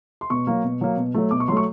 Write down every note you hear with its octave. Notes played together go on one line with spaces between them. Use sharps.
C6
B2 C#6
F#3 A#3
B2
F#3 A#3
B2
F#3 A3
B2 D6
C#6
F#3 A3 C6
C#6